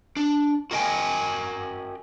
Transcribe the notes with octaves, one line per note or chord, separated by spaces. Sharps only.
D4
F#4 A#4 D#5 F5 G5 G#5